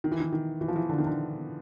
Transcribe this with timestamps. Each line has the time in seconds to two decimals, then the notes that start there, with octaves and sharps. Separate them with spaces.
0.04 D#3
0.12 E3
0.20 D#3
0.33 D#3
0.61 E3
0.68 F3
0.76 E3
0.89 D3
0.98 D#3
1.07 D3